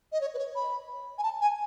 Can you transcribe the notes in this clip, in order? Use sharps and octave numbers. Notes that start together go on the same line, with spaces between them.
D#5
C#5
B4
C#5
B5
G#5
A5
G#5